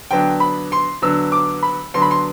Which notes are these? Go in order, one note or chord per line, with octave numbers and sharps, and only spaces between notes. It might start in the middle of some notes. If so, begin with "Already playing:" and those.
D3 F#3 B3 D4 G5
B5
C6
D3 F#3 B3 D4 E6
D6
B5
D3 F#3 B3 D4 C6
B5
C6